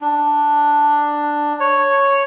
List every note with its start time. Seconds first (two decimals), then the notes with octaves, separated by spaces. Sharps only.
0.01 D4
1.60 C#5